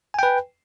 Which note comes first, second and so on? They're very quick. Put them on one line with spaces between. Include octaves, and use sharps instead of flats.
G#5 G5 B4